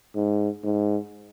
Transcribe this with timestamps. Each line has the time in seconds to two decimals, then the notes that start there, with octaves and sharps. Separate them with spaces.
0.16 G#2
0.64 G#2